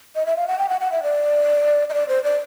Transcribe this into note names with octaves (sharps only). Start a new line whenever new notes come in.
D#5
E5
F5
F#5
G5
F#5
F#5
E5
D5
D#5
D5
C5
D5